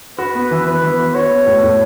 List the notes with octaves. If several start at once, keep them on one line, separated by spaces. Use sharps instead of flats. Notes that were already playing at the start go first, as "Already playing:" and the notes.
F#4 B4
B3
E3
B3 B4
E3
F#4
F#4 C#5
B3
A2
A2